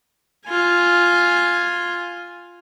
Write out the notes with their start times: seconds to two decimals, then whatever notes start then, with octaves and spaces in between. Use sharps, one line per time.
0.47 F4 G#5